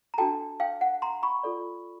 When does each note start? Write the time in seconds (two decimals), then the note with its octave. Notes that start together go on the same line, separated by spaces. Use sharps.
0.14 A#5
0.18 D4 F#4 A4 G5 A5
0.60 F5 G5
0.81 F#5
1.02 A#5 C6
1.23 B5 C#6
1.43 F4 A4 D5